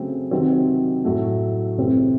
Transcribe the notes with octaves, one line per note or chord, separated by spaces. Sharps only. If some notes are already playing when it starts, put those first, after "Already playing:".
Already playing: C#3 F#3 A3 C4
C3 D#3 F#3 C4
A2 F#3 A3
C2 C3 E3 A3 C4